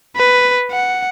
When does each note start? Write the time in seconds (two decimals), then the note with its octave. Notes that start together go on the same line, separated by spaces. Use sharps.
0.16 B4
0.71 F#5